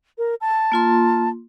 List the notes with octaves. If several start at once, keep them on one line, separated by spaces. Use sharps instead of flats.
A#4
A5
A#3 F4 C6